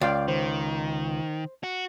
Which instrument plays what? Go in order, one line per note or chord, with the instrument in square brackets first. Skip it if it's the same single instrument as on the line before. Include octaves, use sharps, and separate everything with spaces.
[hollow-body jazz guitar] C#2 [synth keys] D5 F5 G5
[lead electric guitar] D#3 [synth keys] C5
[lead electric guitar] F#4